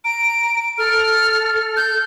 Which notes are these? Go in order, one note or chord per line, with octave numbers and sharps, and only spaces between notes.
A#5 D7
A4 F6
G6